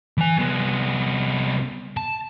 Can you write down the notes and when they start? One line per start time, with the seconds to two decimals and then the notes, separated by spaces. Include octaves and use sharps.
0.18 E3 G#5
0.38 C2 B3
1.97 A5